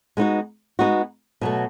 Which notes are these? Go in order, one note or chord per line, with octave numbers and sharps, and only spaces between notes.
G#3 B3 D#4 F#4
G#3 B3 D#4 F#4
B2 F#3 A3